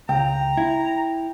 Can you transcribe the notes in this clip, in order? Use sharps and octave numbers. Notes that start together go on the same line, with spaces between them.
C#2 G5 A#5
E4